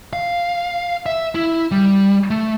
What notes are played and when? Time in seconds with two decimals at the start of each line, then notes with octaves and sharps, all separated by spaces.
0.13 F5
1.06 E5
1.35 E4
1.71 G3
2.30 A3